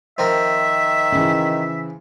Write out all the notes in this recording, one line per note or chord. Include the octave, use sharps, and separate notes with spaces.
D#3 F3 C4 A#4 E5
C#3 E3